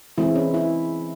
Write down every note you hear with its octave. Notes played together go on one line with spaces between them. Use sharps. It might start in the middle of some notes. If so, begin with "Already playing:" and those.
E3 G#3 C4 E4
C#4
E4